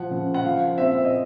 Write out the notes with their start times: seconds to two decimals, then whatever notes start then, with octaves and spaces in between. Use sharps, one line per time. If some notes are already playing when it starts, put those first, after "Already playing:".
Already playing: F3 F#5
0.11 C#3
0.34 F#5
0.44 F3 F5
0.78 C4 E5
1.05 D#5